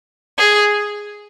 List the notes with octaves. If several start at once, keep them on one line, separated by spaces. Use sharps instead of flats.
G#4